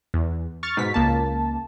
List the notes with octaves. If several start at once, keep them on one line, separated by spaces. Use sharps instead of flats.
E2
C#6 F6 A6
G#2 B2 B6
C#2 A#3 A5